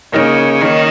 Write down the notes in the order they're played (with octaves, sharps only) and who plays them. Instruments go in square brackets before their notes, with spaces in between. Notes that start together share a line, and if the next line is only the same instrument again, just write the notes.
[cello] C#3 [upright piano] A#3 D#4 A#4 C#5
[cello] D#3 [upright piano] A#3 D#4 A#4 C#5